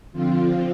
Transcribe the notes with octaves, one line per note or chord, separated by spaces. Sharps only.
D3 F3 C4 F4